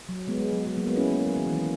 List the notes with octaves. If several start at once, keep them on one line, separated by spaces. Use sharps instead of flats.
F#3
G#3 B3
G#3
F#3
G#3
F#3 A#3
G#3 B3
C#4 E4
A#3 C#4
F#3
D#3
E3
F#3